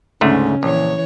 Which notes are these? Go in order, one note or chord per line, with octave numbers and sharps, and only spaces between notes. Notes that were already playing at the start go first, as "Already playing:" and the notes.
D2 G#2 C#3 A3 C#4
A#1 E3 C#5